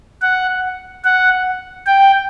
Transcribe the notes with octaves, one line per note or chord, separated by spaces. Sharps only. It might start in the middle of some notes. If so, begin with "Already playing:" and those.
F#5
F#5
G5